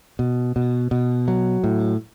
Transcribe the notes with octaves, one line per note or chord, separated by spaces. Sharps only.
B2
B2
B2
F#3
A2